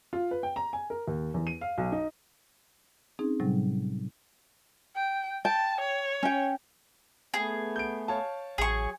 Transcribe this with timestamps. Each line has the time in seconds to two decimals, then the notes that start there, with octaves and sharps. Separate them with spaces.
0.13 F4
0.31 B4
0.43 G5
0.56 A#5
0.73 G#5
0.90 A#4
1.08 D#2
1.34 E2
1.47 D#7
1.61 F5
1.78 B1
1.92 D#4
3.19 C4 C#4 D#4 G#4
3.40 A2 C3 F#3 G3
4.95 G5
5.45 G5 A5
5.81 C#5
6.23 C#4 G5
7.34 A3 B3 G#4
7.76 G6 D7
8.08 C#5 F5 A5
8.58 A1 F#3 G#4 C#6